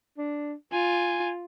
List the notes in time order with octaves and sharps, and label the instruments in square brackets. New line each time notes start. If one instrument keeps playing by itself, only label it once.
[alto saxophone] D4
[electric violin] F4 [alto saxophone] G#5